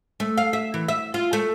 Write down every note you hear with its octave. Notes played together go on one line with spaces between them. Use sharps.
A3
F5
E5
E3
E5
F4
A3